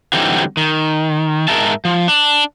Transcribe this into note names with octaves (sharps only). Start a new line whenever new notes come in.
D3 E3 F#3 G3 C4 D#4
D#3
G#2 G#3 A#4 E5 A5
F3
D4